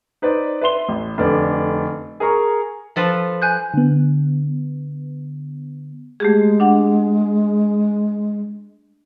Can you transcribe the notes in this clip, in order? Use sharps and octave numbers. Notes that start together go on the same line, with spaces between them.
D#4 B4 C5 D5
B4 E5 C6 G7
A1
F1 D3 B3 D5
G#4 A#4 A#5 C#6
F3 A4 B4
G#5 F#6 G6
D3 B3
G#3 A3 G4 G#4
D4 F#5